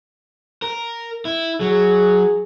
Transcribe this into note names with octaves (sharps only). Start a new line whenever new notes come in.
A#4
E4
F#3 G#4